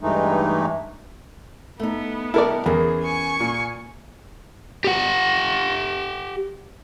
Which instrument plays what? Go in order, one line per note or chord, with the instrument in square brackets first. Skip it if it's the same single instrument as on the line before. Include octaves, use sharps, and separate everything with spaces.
[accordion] G2 E3 G#3 A3 D#4
[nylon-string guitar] A3 D#4 [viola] B3
[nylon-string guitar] G3 D#4 A5 [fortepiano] E4 A#4 D5
[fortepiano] E2 [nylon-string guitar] C#4 A#4 [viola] G#4
[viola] G#5 C#6
[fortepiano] A#2
[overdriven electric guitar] G4 F#5